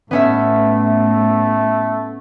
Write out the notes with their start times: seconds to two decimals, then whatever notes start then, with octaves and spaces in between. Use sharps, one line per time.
0.11 A2 A3 B3 C#4 E5